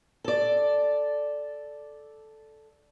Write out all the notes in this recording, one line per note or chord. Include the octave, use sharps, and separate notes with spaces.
A4 D5